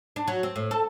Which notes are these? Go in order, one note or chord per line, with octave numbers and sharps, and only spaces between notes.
D4
F#3
C4
A2
A4